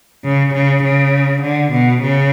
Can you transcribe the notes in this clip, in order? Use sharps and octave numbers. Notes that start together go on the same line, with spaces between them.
C#3
C#3
C#3
D3
B2
C#3